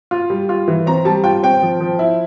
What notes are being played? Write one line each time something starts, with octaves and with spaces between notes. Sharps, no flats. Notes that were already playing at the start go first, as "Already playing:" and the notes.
F4
G3
F4
E3
C4 A#5
G3 A5
F4 G5
C4 G5
F3
F3
E4